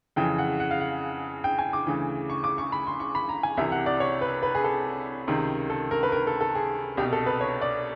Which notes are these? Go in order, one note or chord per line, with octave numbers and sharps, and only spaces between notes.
F2 C#3 E3 G5
F#5
F#5
F5
F#5
G5
G#5
D6
D2 C#3 E3
C#6
D6
C#6
B5
C6
C#6
B5
A#5
G#5
C2 C3 E3 E5
F#5
D5
C#5
B4
B4
G#4
A4
C#2 C3 D#3
A4
A#4
B4
A#4
A4
A4
G#4
C2 B2 G4
A4
B4
C#5
D5